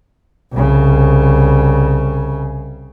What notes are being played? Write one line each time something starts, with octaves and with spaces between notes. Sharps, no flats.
C2 C#3